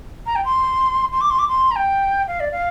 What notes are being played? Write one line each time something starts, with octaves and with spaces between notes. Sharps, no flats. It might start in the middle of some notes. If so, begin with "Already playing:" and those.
A#5
G5
C6
C6
D6
C6
D6
C6
A#5
G5
F5
D5
F5